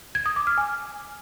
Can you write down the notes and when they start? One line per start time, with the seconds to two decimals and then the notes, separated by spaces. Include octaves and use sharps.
0.15 G#6
0.26 D#6
0.36 D6
0.47 F6
0.58 G#5